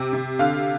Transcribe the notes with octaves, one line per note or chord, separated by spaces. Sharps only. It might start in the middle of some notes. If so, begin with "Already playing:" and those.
Already playing: C3
C3
D3 F5